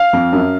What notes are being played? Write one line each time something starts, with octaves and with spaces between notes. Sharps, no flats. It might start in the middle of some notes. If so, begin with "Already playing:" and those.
Already playing: F5
F2
F#2